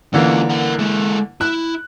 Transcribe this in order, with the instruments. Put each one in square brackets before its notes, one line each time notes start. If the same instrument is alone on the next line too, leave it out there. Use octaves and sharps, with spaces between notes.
[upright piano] D3 E3 A#3 [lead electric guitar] C#4 F4
[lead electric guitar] A#4 F#5
G#3 A4
[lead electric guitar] E4 [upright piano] F#6